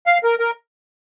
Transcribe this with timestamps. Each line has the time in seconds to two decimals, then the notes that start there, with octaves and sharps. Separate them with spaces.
0.06 F5
0.24 A#4
0.39 A#4